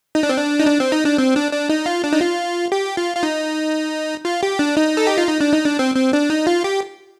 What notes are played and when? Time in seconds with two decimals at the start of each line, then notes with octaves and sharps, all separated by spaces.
0.15 D#4
0.23 D4
0.29 C4
0.37 D4
0.60 D#4
0.67 D4
0.80 C4
0.92 D#4
1.05 D4
1.18 C4
1.35 D4
1.52 D4
1.69 D#4
1.86 F4
2.04 D4
2.13 D#4
2.20 F4
2.72 G4
2.97 F4
3.16 F4
3.23 D#4
4.25 F4
4.43 G4
4.59 D4
4.77 D#4
4.97 A4
5.07 G4
5.18 F4
5.27 D#4
5.41 D4
5.53 D#4
5.66 D4
5.79 C4
5.95 C4
6.13 D4
6.30 D#4
6.47 F4
6.64 G4